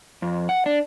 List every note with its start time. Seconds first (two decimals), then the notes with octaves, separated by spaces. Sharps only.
0.22 F2
0.49 F#5
0.66 D4